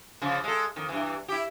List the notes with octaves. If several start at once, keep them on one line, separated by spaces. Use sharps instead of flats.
C#3 F3
G#3 A4
F2 D#3
G2 E3
E4 G4